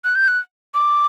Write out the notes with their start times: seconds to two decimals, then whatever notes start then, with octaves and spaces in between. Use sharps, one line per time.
0.04 F#6
0.15 G6
0.28 F#6
0.74 D6